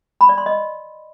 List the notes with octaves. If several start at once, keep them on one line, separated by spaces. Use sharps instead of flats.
B5
D5
C6
D#5